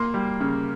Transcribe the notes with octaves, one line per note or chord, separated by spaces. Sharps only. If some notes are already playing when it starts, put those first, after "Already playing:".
Already playing: A#3 C6
G3
C#3